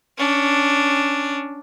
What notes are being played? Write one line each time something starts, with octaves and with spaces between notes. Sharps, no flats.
C#4 D4